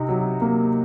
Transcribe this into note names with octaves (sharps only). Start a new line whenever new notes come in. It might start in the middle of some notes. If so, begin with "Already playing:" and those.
Already playing: C3 D#4
F#3
A#3